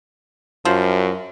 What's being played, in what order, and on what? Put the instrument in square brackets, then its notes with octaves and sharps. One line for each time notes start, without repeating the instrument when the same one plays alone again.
[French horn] F#2 [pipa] F3